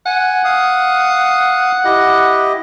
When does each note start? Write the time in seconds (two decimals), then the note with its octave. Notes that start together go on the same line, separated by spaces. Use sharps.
0.06 F#5 G#5
0.45 F5 D#6
1.85 E4 G4 D#5